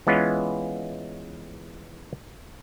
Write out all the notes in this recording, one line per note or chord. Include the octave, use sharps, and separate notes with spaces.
E3 G#3 B3 C#4 F4